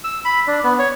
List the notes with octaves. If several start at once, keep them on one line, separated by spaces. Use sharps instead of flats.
E6
B5
D4
B3
C#5